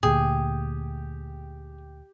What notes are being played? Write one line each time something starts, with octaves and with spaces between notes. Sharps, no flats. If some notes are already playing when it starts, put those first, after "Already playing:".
D2 A#2 G4 G#4